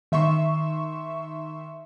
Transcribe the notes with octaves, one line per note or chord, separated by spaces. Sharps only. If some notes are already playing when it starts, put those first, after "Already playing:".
D#3 E5 C6 C#6 E7